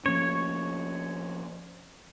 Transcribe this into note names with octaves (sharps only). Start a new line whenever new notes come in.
F3 A#3 C#4 C#5